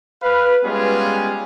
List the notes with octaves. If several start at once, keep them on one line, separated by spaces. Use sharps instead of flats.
B4 F5
G3 G#3 B3 C#4 F4 G#4